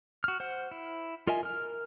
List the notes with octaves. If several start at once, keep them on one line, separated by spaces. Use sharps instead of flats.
F#4 F6
C5 F#5
E4
F4 A#4 D#5 E5 G#5
A#4 F6